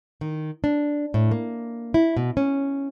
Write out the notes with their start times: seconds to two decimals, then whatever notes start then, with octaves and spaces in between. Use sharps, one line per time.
0.21 D#3
0.64 D4
1.14 A2
1.31 A#3
1.94 E4
2.17 B2
2.37 C#4